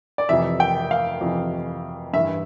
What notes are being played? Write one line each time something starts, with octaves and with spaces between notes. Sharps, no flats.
D5
F2 C3 E3 E5
G5
F5
F2 C3 E3
G2 E3 E5